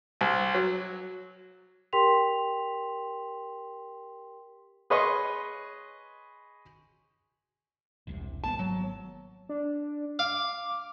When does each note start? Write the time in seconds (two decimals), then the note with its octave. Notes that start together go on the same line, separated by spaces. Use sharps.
0.21 C2
0.55 F#3
1.93 G4 A#4 G5 C6 B6 F7
4.90 G#4 B4 C#5 D#5 C6 C#6
8.07 E1 C2 C3
8.44 G#1 A#3 B3 A5
8.59 F#3
9.49 D4
10.19 F5 D6